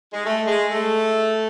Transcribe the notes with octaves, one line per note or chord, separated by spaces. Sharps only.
G#3
A3
G#3
A3